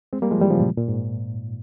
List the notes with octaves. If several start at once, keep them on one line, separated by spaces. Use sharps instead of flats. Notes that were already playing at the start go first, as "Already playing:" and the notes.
G#3 C4
G3 A#3
F3 G#3
E3 G3
C#3 F3
A#2
A#2
G#2